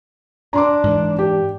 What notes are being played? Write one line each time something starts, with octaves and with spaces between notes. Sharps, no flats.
D4 A#5 C6 D6
G#2 E3
G4